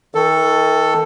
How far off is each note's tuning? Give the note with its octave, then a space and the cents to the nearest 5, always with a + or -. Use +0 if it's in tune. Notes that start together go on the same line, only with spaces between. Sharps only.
D#3 +40 A4 +5